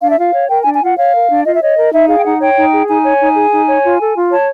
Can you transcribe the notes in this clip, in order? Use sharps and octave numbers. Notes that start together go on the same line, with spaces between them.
D4 F5
E5
F4 F5
C#5
A#4 G5
G#5
D4
G#5
F4 F#5
C#5 F5
A#4
D4
F4 D#5
E5
C#5 D#5
A#4
D#4 E5
G#4 F5
G5
D#4 F#5
C#5 G5
D#4
G#4
D#4 G#5
C#5
D#4
G#4
D#4
C#5
F4
A4
F4
C#5 A5